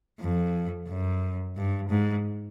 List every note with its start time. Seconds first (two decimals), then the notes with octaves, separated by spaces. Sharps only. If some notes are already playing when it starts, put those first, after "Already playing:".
0.20 F2
0.88 F#2
1.57 G2
1.89 G#2